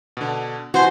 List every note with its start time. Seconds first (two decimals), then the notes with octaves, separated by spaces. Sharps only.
0.17 B2 D3
0.74 E3 F#4 C5 G#5